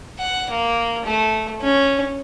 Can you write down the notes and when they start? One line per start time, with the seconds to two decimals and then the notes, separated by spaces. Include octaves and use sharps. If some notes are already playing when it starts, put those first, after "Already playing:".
0.19 F#5
0.51 A#3
1.05 A3
1.61 C#4